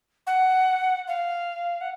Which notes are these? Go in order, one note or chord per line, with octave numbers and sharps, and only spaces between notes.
F#5
F5
F#5